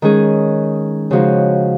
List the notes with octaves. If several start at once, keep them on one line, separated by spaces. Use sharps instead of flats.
D#3 G#3 C#4 G#4
C#3 F3 G#3 D#4 F#4